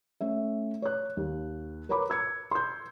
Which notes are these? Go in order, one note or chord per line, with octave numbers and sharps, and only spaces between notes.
A3 C#4 E5
C#5 F#6
D#2
A#4 B4 C#5 A#5 B5 D6
E6 G#6 C#7
C6 G6